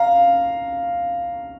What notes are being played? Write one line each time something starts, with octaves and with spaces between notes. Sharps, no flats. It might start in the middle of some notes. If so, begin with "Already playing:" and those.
Already playing: F5 A#5